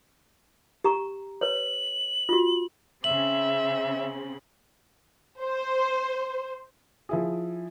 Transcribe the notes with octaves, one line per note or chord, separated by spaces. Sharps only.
G4 A#5 C#6
B4 C#5 F#7
F4 F#4
C#3 C4 E5 F#7
C5
F3 E4 G#4